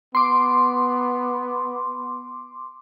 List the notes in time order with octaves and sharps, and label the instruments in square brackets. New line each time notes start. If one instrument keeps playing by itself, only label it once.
[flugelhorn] B3 [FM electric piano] C6 D6